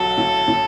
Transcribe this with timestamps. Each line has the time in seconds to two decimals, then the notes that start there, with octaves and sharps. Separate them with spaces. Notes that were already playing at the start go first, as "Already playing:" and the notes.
Already playing: B1 F#3 A4
0.17 A2
0.48 A2